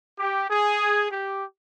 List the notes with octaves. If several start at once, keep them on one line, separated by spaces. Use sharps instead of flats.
G4
G#4
G4